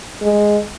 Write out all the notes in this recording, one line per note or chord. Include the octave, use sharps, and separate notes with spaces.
G#3